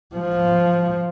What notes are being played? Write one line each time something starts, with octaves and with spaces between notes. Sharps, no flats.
F3